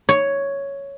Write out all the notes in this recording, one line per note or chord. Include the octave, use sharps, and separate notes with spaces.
C#5